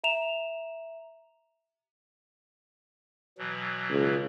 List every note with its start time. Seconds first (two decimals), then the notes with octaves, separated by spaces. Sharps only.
0.04 E5 A#5 E7 F7
3.38 B2 E3 F#3
3.90 C#2